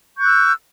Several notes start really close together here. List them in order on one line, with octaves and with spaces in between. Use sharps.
C#6 G6 F#6 E6